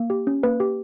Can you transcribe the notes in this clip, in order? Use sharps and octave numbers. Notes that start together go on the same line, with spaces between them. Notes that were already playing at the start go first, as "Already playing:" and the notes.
Already playing: A#3
G4
C#4
A#3 B4
G4